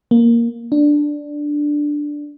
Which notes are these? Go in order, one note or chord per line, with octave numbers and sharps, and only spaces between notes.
A#3
D4